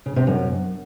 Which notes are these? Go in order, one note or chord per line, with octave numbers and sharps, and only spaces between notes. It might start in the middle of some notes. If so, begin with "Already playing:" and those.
C#3
C3
F#2